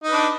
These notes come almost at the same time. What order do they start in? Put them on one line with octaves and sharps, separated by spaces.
D#4 B4 D4